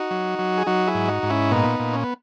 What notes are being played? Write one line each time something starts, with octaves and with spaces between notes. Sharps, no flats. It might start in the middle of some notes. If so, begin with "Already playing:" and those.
Already playing: D#4 F#4
F#3
F#3
G#4
F#3 D#4 F#4
E4 G#4
G#2
D#4 F#4
G#2
C#4 E4
A#2 B3 D#4
A#2
C#4
B3